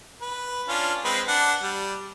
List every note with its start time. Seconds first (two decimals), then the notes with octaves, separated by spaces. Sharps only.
0.21 B4
0.68 C#4 D4 F4
1.04 G#3 C4 B4
1.28 D4 F#5
1.63 G3